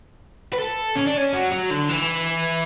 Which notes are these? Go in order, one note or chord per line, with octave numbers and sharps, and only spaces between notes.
B4
A4
C#4
D4
C#4
F#3
F#3
D3
E3